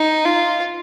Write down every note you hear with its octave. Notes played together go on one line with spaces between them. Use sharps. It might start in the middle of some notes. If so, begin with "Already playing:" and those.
Already playing: D#4
F4